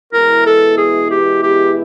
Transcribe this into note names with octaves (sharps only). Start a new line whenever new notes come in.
E2 B2 G#3 B3 E4 A#4
A4
G#4
G4
G4